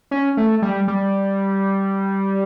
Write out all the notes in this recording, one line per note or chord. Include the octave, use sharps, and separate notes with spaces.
C#4
A3
G3
G3